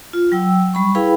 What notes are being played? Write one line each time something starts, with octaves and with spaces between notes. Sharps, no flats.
F4
F#3 G5 E6
G3 B5 C#6
E4 G#4 B4 F5 G5 B5